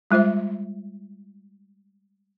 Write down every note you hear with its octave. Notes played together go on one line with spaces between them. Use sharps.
G3 G#3 F4 C5 E5